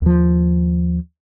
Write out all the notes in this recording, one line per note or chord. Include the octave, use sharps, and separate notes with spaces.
D#2 F3